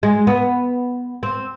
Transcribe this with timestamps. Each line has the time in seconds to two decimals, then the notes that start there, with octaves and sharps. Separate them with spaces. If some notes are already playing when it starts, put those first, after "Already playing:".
0.03 G#3
0.27 B3
1.23 C4